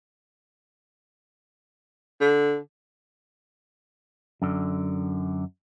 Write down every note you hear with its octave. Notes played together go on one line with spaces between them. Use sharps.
D3
F#2 D3